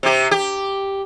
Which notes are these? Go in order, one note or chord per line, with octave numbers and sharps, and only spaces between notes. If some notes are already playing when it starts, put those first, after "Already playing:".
C3 G4
G4